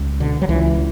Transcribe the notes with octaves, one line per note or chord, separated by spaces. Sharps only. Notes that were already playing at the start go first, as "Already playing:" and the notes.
Already playing: C#2
B2 D3
F#3
C#2 E3